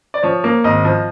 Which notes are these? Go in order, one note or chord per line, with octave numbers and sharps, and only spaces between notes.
D5
F3 C#5
A#3
G#1 D#5
F3